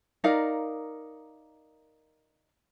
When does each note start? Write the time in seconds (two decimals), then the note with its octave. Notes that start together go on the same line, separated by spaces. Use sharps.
0.24 D#4 A#4 D5 F5